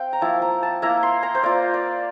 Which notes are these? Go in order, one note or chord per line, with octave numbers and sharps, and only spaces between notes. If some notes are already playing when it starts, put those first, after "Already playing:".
Already playing: C4 C5 F5 G5
A#5
F3 A#3 E4 A5
A#5
A5
A#3 E4 A#5
C6
A#5
C5
A#3 F4 D5
D5